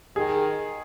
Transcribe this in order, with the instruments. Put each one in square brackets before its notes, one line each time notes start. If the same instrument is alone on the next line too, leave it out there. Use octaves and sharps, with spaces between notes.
[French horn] D#3 [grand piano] G#4